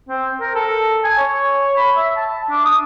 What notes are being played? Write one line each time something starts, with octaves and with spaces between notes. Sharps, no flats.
C4
A#4
A4
G#5
C#5
B5
E5
A5
D4
D#6